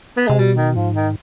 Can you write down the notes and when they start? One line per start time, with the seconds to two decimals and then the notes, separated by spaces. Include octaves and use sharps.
0.17 B3
0.27 C3 G#3
0.39 B2 G3
0.57 D#3
0.76 G#2 F3
0.95 D#3